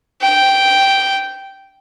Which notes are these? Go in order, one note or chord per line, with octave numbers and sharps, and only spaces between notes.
G5